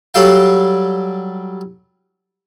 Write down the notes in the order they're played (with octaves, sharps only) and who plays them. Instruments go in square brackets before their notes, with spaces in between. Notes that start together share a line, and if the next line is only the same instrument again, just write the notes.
[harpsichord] F#3 G3 A4 F5 G5